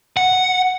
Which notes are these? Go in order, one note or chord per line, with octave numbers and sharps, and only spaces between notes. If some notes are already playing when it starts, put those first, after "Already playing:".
F#5